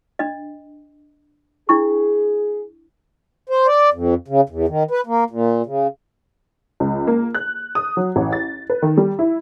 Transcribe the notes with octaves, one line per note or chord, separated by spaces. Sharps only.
D4 D#5
D4 E4 G#4 C#6
C5
D5
F2
C#3
E2
D#3
B4
A#3
A#2
C#3
C#2
A#3
F#6
D#6
F#3
A1
A6
B4
D#3
G3
E4